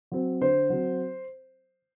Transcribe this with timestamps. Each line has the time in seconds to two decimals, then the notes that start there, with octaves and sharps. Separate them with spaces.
0.12 F#3 C4
0.41 D3 C5
0.70 F#3 C4